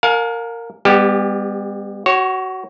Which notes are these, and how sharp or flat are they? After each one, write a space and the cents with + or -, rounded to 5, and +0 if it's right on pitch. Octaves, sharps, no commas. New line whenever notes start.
A#4 -15 F5 +30 G#5 +35
G3 +40 B3 +25 G4 +0
F#4 +20 C#5 -15